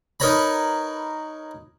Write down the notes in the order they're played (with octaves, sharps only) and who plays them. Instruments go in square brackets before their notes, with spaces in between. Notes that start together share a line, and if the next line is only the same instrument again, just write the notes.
[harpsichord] D#4 A#4 B4 C#5 A#5 B5